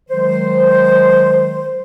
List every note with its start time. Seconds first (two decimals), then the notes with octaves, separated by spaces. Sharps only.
0.09 D#3 F#3 G#3 C5